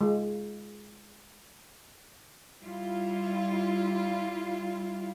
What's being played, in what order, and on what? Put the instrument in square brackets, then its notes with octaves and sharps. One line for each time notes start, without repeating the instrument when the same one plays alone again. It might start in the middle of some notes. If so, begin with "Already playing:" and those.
[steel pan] G#3 F4
[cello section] G3 E4 F4